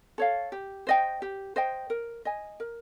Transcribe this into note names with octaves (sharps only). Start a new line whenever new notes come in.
A4 C#5 F5
G4
C5 D#5 G5
G4
C5 D#5 G5
A#4
D#5 G#5
A#4